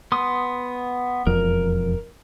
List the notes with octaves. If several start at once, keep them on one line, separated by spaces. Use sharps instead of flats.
B3 C6 D#6
E1 F2 A#4